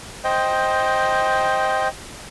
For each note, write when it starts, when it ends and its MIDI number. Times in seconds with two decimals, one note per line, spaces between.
0.24 1.88 72
0.24 1.88 75
0.24 1.88 79